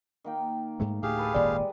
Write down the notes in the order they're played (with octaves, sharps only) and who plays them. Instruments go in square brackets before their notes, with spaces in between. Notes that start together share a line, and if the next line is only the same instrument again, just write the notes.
[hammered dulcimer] D#3 A#3 G5
[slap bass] G#2 G#3 A3
[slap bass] D2 A2 [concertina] G4 G#4 F5
[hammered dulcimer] A4 B4 A5
[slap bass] D#1 G#1 A#2 [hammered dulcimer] G3 G#3 [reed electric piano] D5